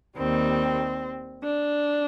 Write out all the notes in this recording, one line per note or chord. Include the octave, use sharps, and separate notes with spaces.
D#2 D#3 G3 C4
D4